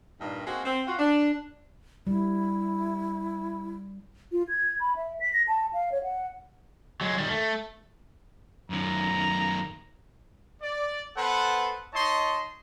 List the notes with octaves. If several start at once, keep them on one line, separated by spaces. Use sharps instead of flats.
G2 A#2 D#3
G#3 A#3 C4 F#4
C4
F4 F#4
D4
G3 E4
F4
G#6
B5
E5
B6
A#6
A5
F5
C#5
F#5
F#3 G#3
D#3 G3
A3
F#2 D#3 A#5
D5
B3 A4 B4 C5 F#5
D#4 C#5 D#5 A5 C6